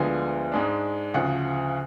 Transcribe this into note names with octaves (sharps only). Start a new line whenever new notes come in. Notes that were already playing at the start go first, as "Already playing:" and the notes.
Already playing: D2 D3 F3 G#3 B3 G#5
G#2 G#3 D4
D2 C#3 F3 F#5